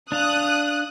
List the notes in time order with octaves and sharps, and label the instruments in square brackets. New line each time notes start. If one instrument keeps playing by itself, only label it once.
[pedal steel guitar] D4 F5 [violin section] D#6 F#6